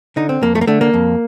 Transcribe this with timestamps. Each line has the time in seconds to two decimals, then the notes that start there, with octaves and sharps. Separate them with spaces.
0.16 D3 D#4
0.29 C4
0.42 F2 A#3
0.55 A3
0.61 A#3
0.67 D3 A3
0.81 A#3
0.94 F2